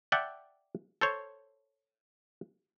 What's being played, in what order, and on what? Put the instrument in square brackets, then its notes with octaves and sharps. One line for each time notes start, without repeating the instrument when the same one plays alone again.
[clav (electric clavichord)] D5 E5 F#5 G5 A5
A4 C5 C#5